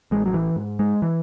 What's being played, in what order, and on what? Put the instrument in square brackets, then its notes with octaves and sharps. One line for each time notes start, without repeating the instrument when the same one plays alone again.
[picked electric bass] A1 G#3
F#3
E3
G#2
G#3
E3